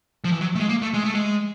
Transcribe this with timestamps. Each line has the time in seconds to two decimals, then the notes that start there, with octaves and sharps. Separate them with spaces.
0.24 F3
0.32 E3
0.41 F#3
0.55 A3
0.60 G#3
0.69 A#3
0.82 A3
0.94 G#3
1.04 A3
1.14 G#3